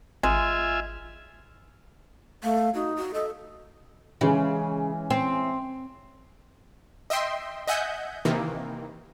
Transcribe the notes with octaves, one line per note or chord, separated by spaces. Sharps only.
G#1 G#3 F4 E5 G#5
A3 F5
D#4 F#4
F#4
A4 D#5
C#3 E3 G#3 C#4
C4
D#5 E5 G5 C6
D#5 E5 F#5 G#5 G6
C3 D#3 E3 A#3